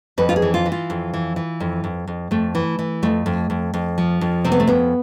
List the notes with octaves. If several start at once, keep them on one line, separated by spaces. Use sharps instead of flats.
F2 B4
F4
G#4
E3
F4
E3
F4
F2
E3
E3
F2
F2
F2
F2 A3
E3
E3
F2 A3
F2
F2
F2
F3
F2
C3 C4
B3
A3
F2 B3